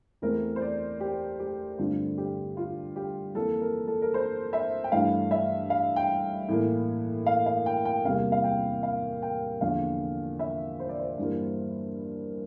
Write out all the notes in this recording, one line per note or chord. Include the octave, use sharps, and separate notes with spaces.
E2 E3 A3 C4 A#4
C5
D5
G4
G4
G2 D3 A3 C4 F4
G4
F4
G4
F2 E3 A#3 A4
A#4
A4
A#4
C5
E5
G5
G2 E3 A3 F5
E5
F5
G5
A2 E3 A#3
F5
F5
G5
G5
E2 C3 G3 A#3 F5
F5
G5
F5
G5
E2 D3 F3 A#3 F5
E5
C5
D5
C5
G2 E3 G3 A#3